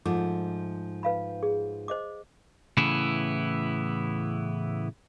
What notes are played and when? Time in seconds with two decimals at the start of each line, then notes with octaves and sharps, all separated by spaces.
0.06 G#2 F3 A3 D6
1.03 B4 F5 B5
1.43 G#4
1.88 C5 D#5 D6
2.77 A2 C#3 E3 B3 E4